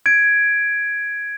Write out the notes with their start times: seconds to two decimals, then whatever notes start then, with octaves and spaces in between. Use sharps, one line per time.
0.06 G#6 D7